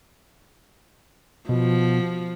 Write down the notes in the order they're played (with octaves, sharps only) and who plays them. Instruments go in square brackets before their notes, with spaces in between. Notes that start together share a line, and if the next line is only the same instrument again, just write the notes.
[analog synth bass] B2 [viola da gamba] F3